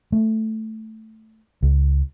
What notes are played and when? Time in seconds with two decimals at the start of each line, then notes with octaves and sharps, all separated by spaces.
0.12 A3
1.63 C#2